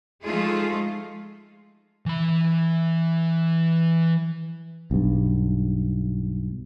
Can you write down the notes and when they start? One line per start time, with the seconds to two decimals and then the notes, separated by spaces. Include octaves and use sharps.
0.24 F3 G#3 A3 D#4 F4 G#4
2.06 E3 B5
4.91 B1 G2